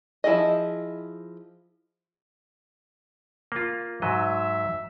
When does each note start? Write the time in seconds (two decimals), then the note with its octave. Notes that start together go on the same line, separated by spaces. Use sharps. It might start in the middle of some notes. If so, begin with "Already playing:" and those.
0.24 F3 E4 G#4 D#5
3.52 A#3 F4
4.02 G#2 F#3 D#5 E5